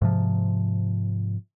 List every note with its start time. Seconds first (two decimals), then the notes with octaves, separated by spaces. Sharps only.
0.02 G#2 C3 F3